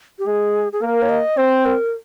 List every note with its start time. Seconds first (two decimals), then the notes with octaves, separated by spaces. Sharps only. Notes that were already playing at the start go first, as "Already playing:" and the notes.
0.19 G4
0.26 G#3 G#4
0.73 G#4
0.81 A#3 A#4
1.02 C#5
1.09 D#5
1.37 C4 C5
1.66 A#4